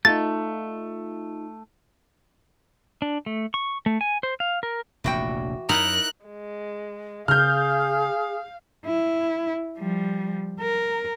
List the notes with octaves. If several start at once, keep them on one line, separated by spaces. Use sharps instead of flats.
A3 D#4 F4 A6
D4
A3
C#6
A3
G#5
C5
F5
A#4
F1 A#1 A#2 E3 F#4 G5
F#2 D#4 E4 A#4 F#6
G#3
C#3 G#4 F5 F6 G6
E4
F3 G3
A#4